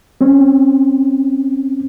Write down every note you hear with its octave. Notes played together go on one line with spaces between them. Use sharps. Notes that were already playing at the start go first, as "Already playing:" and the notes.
C4 C#4